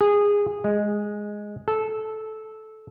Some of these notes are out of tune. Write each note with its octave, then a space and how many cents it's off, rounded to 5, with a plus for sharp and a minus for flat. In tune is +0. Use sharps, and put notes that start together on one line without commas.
G#4 -20
G#3 +0
A4 -15